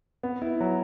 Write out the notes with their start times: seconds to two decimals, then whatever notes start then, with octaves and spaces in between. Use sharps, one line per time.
0.23 B3
0.42 E4
0.60 F#3